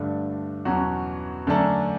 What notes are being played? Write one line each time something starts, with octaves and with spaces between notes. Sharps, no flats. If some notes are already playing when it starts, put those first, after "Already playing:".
Already playing: G2 D3 A3 D4
E2 B2 F#3 C#4 F#4
F#2 D3 A3 D4 A4